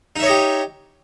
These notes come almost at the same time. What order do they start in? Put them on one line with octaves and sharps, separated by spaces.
D#4 E5 C#5 D#5 G4